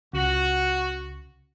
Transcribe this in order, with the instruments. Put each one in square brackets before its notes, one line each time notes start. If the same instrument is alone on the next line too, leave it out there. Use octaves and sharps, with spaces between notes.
[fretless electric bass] C#2 [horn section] F#4